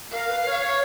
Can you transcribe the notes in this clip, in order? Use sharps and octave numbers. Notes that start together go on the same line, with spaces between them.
A#4 F5
B4
C#5
C#5